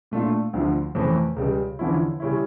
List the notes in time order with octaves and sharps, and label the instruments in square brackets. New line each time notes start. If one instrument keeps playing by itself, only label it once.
[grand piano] A#2 A3 D4 F4
D2 D3 F3
F2 C#3 E3 A3
C#2 C#3 G3
E2 D3 F3 C#4 E4
C#3 G3 C#4 E4